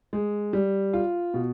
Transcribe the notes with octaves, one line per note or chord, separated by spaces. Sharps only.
G#3
G3
F4
B2